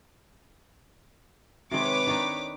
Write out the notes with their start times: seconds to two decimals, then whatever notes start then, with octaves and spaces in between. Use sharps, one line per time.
1.71 C3 D#3 G#3 B4 C#5 D6
2.07 D#3 D4 D#4